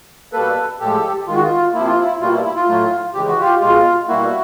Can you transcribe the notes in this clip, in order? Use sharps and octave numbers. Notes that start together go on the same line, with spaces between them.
B2 G3 A#3 A4 B4
A2 F3 G#3 G4 A4
D#3 G#3 F4
F#4
F4
C3 F3 A#3 E4
F4
E4
B2 G3 A#3 F4
E4
E4
F4
A2 F#3 A3
C#3 E3 G#3 G4
F#4
F4 G4
B2 G#3 F4
B2 G3 A#3 E4 F#4